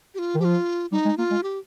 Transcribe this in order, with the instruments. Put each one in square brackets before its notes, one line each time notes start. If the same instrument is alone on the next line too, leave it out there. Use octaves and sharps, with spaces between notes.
[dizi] G4
F4
[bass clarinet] D#3
[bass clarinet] F3 [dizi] F4 G4
[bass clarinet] G3 [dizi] D#4
[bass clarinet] G#3
[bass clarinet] A#3 [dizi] F4
[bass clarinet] G#3
[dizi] G4